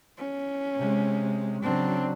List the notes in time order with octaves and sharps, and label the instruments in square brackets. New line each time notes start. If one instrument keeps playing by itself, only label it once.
[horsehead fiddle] C#4
[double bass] C3 G#3
[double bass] C#3 F#3 [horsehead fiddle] C4 D4